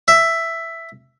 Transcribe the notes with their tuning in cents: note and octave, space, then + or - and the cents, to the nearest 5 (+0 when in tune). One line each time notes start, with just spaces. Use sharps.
E5 +5